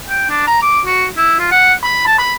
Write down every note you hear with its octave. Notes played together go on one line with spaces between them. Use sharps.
G5
D4
A#5
D6
F#4
E4
F4
F#5
B5
A5
B5